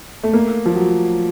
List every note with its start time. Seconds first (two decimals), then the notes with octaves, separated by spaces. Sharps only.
0.23 A3
0.34 A#3
0.66 F3
0.75 F#3